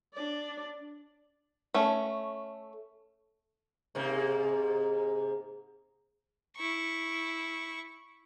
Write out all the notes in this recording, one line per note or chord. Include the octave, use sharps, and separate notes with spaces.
D4 D5
A3 C#4
G#2 C3 A#3
E4 C#6